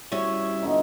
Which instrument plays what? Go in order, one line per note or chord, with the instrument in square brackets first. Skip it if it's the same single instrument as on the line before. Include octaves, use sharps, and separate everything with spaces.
[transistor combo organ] G3 E4 E5 [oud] C#4 F#4 C#5
[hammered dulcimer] B2 D3 D#4